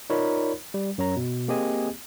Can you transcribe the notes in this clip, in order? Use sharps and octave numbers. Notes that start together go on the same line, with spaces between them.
D#4 F4 A#4 C#5 D5 B5
G3
F#2 C#5 A#5
B2
A#3 C4 G4 G#4 D#5 G#5